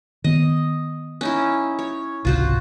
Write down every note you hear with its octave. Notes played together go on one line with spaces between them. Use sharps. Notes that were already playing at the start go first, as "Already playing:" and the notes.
D#3 B3 D#5
C#4 D#4 E4
C#5
G#1 C#2 C3 F4 F#4 C5